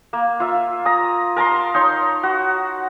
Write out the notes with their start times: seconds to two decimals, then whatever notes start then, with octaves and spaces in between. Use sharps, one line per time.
0.13 A#3
0.40 F4 E5
0.85 A#5 D#6
1.36 A#4 A5 A#5 C6
1.74 D#4 C#5 C6
2.23 F#4